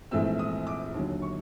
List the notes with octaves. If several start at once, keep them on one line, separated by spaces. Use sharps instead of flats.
A#1 G#2 E3 A3 C4 E6
D#6
D6
D#2 D3 F#3
C#6